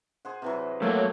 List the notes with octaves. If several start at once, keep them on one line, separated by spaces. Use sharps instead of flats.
G#4 C5 F#5
C3 E3 F#3
F#3 A3 A#3 F#4 G#4 G5